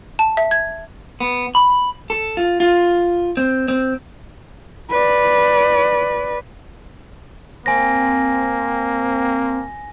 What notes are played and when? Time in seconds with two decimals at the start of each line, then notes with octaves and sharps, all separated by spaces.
0.19 A5
0.37 E5
0.51 G#6
1.20 B3
1.55 B5
2.10 A4
2.37 F4
2.60 F4
3.37 C4
3.68 C4
4.90 B4 D5
7.66 A#3 C4 G#5 A#6